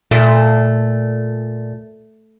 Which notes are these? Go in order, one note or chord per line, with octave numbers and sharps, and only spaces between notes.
A#2 A3